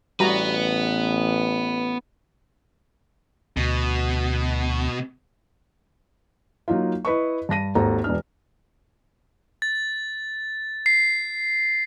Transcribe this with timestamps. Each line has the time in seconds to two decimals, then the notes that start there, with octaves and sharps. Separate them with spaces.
0.20 A1 G3 B3 F#4 B4 A#5
3.57 D2 B2
6.68 F#3 A#3 D#4 F4
7.05 E4 B4 D#5 C#6
7.49 G2 A5 A#6 D#7
7.75 G#1 D#2 A4 C5 A#5
8.04 E1 D4 F6
9.62 A6
10.86 C7